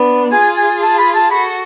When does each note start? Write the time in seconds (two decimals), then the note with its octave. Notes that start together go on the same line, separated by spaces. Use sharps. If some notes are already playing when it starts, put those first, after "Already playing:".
Already playing: B3 D4
0.32 F4 G#4 G#5
0.57 G#5
0.82 A5
0.98 B5
1.15 A5
1.31 F#4 A4 B5